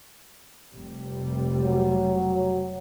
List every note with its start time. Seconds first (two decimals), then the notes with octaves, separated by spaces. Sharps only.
0.74 F1 C3 G3
1.60 F#3